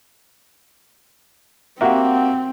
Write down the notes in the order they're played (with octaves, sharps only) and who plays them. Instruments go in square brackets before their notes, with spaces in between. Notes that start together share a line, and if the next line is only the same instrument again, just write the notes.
[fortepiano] A#3 F#4 G4 [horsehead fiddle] C4 [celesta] E5 F#5